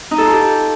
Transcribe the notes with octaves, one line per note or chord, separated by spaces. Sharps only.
D#4
A4
F4
G4